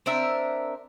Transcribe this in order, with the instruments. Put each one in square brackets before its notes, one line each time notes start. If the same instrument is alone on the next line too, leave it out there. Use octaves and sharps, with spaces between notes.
[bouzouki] C4 D4 A#4 E5